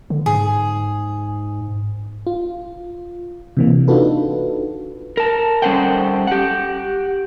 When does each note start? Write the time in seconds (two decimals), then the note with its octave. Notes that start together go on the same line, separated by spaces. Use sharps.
0.10 D3
0.26 G#2 G#4
2.27 F4
3.57 C3 E3 A#3
3.88 D4 D#4 F4 F#4 A4 B4
5.17 A#4 A5
5.62 G3 C#4 A4 C5 F#5 G5
6.27 G4 F#5